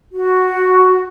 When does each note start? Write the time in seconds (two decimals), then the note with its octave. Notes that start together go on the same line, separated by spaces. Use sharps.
0.13 F#4